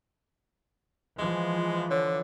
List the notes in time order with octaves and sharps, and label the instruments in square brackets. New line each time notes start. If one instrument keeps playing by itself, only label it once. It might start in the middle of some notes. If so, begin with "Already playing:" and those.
[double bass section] E3 F3 [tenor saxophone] G#3
[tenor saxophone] D3 [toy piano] C#5